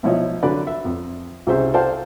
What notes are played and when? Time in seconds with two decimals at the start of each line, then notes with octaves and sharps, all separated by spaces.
0.03 B1 F3 E4 C#5 D#5
0.43 D3 F#3 B4 D5
0.67 E5
0.85 F2
1.47 C2 C#3 C5 E5
1.74 A4 C5 D5 F5 G5 A5